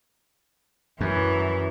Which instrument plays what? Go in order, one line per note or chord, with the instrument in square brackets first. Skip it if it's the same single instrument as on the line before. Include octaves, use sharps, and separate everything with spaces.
[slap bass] F#2 [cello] E3